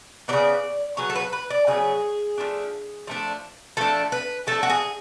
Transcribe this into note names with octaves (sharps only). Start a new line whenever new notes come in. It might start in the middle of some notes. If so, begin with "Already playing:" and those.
C#3 F#3 B3 D5
C#3 F#3 B3 C#5
A4
B4
B4
D5
C#3 F#3 B3 G#4
F3 A3 D4
F3 A3 D4
F3 A3 D4 A4
B4
F3 A3 D4 A4
F#4
G#4